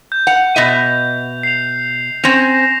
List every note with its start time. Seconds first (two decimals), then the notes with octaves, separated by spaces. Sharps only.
0.12 G6
0.27 F#5 F7
0.56 B2 D#5 E5
1.43 C7 F7
2.24 C4 C#4 A#6 E7 F7